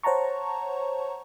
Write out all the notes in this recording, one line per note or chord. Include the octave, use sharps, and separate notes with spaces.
C5 C#5 F#5 A5 A#5 C#6